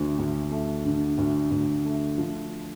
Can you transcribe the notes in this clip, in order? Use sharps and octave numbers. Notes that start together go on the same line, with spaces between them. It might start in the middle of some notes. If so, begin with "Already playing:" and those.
Already playing: D2 D3
D2
A3
D3
D2
D2
A3
F3